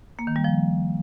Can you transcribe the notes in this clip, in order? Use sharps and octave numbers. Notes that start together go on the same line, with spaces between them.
A#3
D#3
G3
F3